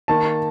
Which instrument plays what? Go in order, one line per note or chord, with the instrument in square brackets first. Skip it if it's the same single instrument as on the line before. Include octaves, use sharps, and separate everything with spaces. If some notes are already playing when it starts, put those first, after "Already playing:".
[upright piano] D#3 A#3 A5